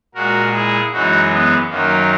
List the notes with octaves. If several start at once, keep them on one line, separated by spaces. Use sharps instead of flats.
A#2 G#3 F#4 A#4
E4 G#4
F#2 E3 G#3 D#4 F#4
B3
F#2 D#3 F#3 A#3